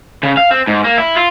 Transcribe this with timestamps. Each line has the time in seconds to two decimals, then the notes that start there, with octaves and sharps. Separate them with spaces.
0.23 C#3
0.37 F5
0.51 C4
0.67 G#2
0.84 A#3
0.98 E4
1.16 F4